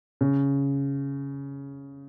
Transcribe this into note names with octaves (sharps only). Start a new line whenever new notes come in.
C#3